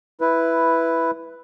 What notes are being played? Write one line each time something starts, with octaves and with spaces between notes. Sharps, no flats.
E4 B4